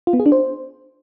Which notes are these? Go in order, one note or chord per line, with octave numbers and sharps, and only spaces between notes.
F4
B3
G#4
D4
C5